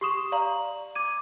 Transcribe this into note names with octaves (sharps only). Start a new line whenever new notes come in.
G4 C6 C#6 D#6 E7
D5 F5 A#5 F#7
D6 G#6 D#7